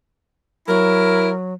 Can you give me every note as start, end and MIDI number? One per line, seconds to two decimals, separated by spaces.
0.68 1.54 54
0.68 1.30 64
0.68 1.30 70